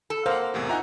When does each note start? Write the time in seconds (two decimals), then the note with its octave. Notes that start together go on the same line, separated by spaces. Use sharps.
0.10 A4
0.26 A#3 C5 F5 F#5
0.54 E2 A2 C3
0.69 D#4 F4 E5 F#5 G#5 A#5